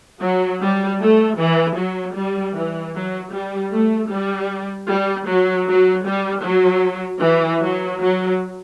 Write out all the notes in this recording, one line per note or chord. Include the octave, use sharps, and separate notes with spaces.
F#3
G3
A3
E3
F#3
G3
E3
F#3
G3
A3
G3
G3
F#3
F#3
G3
F#3
E3
F#3
F#3